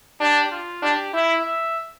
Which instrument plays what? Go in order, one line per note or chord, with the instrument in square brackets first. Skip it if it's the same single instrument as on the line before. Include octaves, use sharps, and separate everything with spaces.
[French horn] D4 [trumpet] G4
[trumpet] F4
[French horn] D4 [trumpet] G4
[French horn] E4 [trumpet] E5
[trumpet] E5